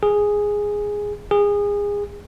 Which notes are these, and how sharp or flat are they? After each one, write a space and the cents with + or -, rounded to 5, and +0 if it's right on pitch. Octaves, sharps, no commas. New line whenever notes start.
G#4 -5
G#4 -25